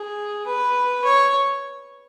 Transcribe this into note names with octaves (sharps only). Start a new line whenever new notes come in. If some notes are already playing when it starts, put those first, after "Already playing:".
Already playing: G#4
B4
C#5